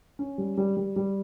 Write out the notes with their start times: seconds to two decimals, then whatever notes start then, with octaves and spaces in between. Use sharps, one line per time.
0.19 C#4
0.38 G3
0.57 G3
0.77 G3
0.96 G3